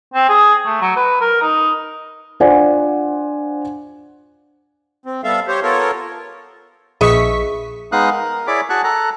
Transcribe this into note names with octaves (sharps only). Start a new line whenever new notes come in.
C4
G#4
A3
F#3
B4
A#4
D#4
D4 F4 C5 D5 F#5 G#5
C4
G3 B3 A4 E5 F5
G4 C5 C#5
B3 F4 A4 A#4 C#5
A#1 G#4 B4 D#5 E5 C#6 B6
G#3 B3 D#4 F5 D#6 F#6
A#4
E4 G#4 C#5 D5 B5 D6
F#4 G#4 A5 C#6 F#6
A4 A#5 F#6